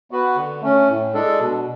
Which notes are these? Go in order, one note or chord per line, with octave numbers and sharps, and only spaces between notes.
B3 F#4 B4
D3
A3 C#4
A2
G#3 D4 A4
B2